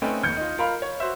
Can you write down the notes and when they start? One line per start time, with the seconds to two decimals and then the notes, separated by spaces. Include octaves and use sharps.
0.02 A3 C4 C#4 D#4 B4 G5
0.23 F1 D#2 G6 C#7
0.37 D#4 F4
0.58 F4 A#4 F5 A#5 B5
0.82 C#5
1.00 F#4 C5 E5